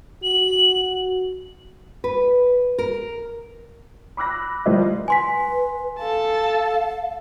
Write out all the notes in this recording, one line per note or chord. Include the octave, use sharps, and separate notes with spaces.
F#4 F#7
B4
A#4
B5 D6 E6 F#6 A#6
F3 G3 E4 A#4 C5 D#5
B4 G#5 C6 B6
A4 F5 A5